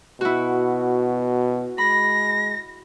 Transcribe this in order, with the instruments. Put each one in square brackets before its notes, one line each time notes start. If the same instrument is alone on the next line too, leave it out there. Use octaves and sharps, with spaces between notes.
[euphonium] B2 [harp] E4 F#4
[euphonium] G#3 [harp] B5 [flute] A#6